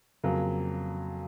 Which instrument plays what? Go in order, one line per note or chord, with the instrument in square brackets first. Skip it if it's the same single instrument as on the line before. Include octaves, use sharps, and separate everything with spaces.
[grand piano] F2 C#3 F#3 A#3